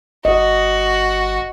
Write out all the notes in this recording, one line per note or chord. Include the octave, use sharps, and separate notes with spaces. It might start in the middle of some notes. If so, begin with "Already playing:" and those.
G1 F#4 D#5